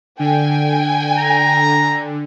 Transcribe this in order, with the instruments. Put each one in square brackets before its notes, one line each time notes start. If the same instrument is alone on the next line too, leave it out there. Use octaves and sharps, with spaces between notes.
[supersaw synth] D3 [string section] G5 G#5
[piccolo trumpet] A#5